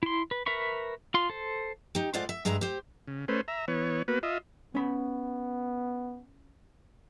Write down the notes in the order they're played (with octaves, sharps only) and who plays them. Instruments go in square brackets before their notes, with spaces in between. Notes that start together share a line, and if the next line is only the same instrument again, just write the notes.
[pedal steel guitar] E4 C6
B4
A#4 B4 E5 B5 C#6
F4 C6
A4 C5
[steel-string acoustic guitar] D#4 G4
A2 G#3 F4 C5 D5 F#5
E5
G2 G#3 G#4 E5 A#5
G4 C5
[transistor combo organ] C#3
A3 C#4 B4 C5
E5 A#5
E3 B3 C#5
A#3 B3 F#4 B4
F4 D#5 E5
[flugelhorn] B3 [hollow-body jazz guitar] C#4 B5